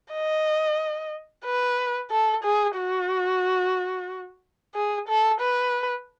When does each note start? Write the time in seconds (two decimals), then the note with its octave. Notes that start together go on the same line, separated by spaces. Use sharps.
0.13 D#5
1.45 B4
2.11 A4
2.44 G#4
2.77 F#4
4.75 G#4
5.08 A4
5.41 B4